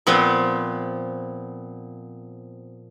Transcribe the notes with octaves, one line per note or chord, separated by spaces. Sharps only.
A#2 F3 B3 C4